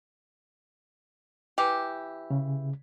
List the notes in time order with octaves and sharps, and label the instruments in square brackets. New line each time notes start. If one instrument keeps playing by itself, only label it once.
[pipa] E3 G4
[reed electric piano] C#3